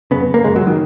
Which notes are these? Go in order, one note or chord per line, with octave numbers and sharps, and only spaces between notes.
F#2 C#3 B3
A#3
F#2 C#3 G#3
F#3
D#3